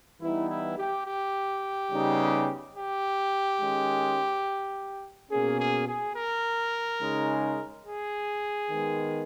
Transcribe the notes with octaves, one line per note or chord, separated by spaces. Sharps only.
E3 G3 B3 D#4 E4
E4
G4
G4
C#3 G3 B3 D#4
G4
D#3 G#3 C#4
B2 A#3 C#4 G#4
G#4
G#4
A#4
C#3 G#3 D#4
G#4
D#3 G#3 B3